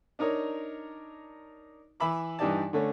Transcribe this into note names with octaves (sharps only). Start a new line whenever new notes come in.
D4 D#4 A#4 C#5
E3 E5 B5 D6
G2 E3 D#4 G4 D5 A5
D3 A3 C#4